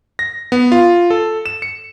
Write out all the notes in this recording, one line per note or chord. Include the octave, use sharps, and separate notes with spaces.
A#6
B3
F4
A4
E7
C#7